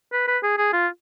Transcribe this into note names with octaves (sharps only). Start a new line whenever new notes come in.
B4
B4
G#4
G#4
F4